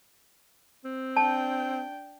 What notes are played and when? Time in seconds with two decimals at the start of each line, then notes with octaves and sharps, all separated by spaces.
0.85 C4
1.17 D4 G5 A5